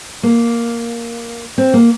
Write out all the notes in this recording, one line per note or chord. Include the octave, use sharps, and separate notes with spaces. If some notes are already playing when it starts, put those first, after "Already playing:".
A#3
C4
A#3